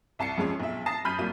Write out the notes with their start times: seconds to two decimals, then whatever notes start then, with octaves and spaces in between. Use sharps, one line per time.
0.19 C2 A5 C7 C#7
0.37 F2 G#3 C#4
0.59 B1 E5
0.86 A5 D#6 A6 A#6 C7
1.05 F#2 B5 F6 G6 B6 D#7
1.18 C2 F#3 A#3 D#7